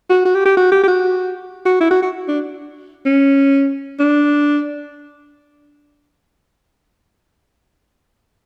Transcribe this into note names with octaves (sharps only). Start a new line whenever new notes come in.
F#4
F#4
G4
G4
F#4
G4
G4
F#4
F#4
E4
F#4
F#4
D4
C#4
D4